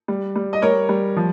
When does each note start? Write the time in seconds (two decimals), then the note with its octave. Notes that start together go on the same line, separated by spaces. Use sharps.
0.08 G3
0.36 G3
0.53 D#5
0.62 G3 A#4 C#5
0.89 G3
1.17 F3